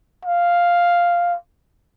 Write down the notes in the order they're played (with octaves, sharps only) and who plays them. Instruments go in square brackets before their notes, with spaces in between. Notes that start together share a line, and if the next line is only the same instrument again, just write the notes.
[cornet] F5